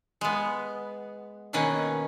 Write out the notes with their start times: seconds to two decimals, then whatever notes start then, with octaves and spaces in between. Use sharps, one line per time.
0.21 G#3 B3
1.53 B2 D#3 A#3 C#4 B4 F#5